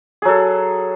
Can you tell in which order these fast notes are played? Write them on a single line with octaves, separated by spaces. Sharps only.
G#4 F#3 A4